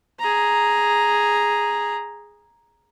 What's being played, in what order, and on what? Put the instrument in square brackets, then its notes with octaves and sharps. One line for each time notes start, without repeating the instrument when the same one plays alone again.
[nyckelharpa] G#4 A#5